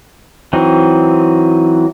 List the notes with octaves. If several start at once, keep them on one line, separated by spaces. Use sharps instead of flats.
E3 F#3 C4 D#4